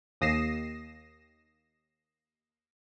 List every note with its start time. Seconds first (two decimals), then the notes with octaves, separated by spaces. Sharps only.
0.21 D#2 D#6 A#6 C7 E7